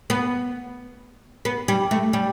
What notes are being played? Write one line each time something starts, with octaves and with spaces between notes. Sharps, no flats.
B3
B3
G3
A3
G3